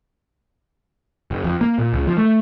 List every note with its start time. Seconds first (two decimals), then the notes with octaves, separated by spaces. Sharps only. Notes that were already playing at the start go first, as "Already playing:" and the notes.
1.31 F#1
1.44 F2
1.61 A#3
1.78 A#2
1.93 C#2
2.07 F3
2.18 A3